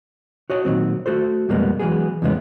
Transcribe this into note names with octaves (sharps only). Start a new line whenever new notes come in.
F#4 C#5 D#5 A5
A#2 D#3 F#3 C4
A3 F#4 A4 C5
F2 B2 G3 G#3 A#3 B3
E3 F#3 G#3 B3 G#4
E2 A2 C#3 G#3 B3 C#4